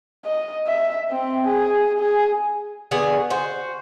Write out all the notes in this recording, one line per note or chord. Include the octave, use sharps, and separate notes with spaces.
D#5
E5
C4
G#4
G#4
D3 B3 F#4 G#4
F#4 C5